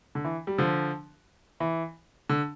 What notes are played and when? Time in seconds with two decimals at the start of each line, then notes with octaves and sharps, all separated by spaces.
0.15 D3
0.24 E3
0.47 G3
0.58 D3 F3
1.60 E3
2.29 D3